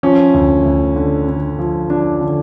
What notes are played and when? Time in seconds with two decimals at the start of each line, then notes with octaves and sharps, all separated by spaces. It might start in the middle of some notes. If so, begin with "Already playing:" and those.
0.03 F3 C#4
0.34 D2
0.66 D2
0.96 D3
1.28 D3
1.59 F3
1.89 F3 D4
2.21 D3